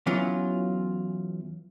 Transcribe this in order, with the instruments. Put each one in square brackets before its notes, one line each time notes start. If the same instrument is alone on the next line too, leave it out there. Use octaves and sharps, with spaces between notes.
[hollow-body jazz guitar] E2 E3 F#3 C#4 F4